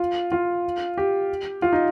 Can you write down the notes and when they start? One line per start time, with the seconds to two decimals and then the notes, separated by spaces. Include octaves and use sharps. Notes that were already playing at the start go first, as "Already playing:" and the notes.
Already playing: F4
0.32 F4
0.98 G4
1.62 F4
1.73 D#4